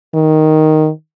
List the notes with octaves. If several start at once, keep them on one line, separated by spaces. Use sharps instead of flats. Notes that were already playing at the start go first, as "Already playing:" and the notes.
D#3